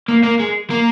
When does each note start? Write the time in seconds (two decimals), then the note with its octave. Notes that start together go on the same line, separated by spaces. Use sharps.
0.08 A#3
0.23 A#3
0.40 G#3
0.70 A#3